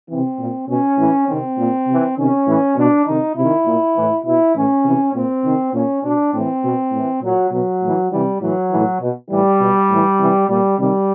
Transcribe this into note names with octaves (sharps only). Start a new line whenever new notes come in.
C3 E3 C4
A#2
B2 C#4
A2 E3
C3 D#3 C4
A#2
C3 E3
C3 D#3 C#4
A2 E3
B2 D4
C3 D#3 D#4
C3 E4
D#3
A#2
A2 E3
B2 E4
A2 E3 C#4
C3 E3
A#2 C4
C3 D#3
A#2 C#4
B2 D4
A2 E3 C4
B2
A2 E3
A#2 F#3
B2 F#3
A2 E3
C3 E3 G3
A2 E3 F#3
A2 E3
B2
A2 E3 G3
B2
A2 E3
C3 E3
A#2 G3
C3 D#3 G3